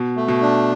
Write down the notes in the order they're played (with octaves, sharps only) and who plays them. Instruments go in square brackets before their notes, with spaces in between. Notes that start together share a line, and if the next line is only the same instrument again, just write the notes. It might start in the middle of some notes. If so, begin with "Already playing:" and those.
Already playing: [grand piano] B2
[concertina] A3
[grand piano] B2
[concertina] D4